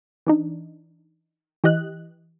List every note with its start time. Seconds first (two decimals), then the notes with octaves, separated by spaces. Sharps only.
0.27 E3 D4 D#4
1.64 E3 G4 D#5 F#6